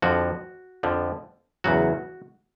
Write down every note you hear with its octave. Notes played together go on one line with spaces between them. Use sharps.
F2 D3 F3 F#4
F2 D3 F3
E2 C#3 F#3 F#4